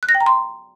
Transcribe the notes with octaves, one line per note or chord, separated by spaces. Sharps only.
F#6
A#6
G5
A#5
C6